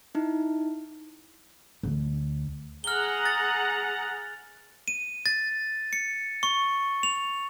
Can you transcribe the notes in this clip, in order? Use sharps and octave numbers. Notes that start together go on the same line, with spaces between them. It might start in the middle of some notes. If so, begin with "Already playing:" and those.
D#4 E4
D2
G#4 F#5 A#5 F6 G7
A6
D#7
A6
C#7
C#6
F7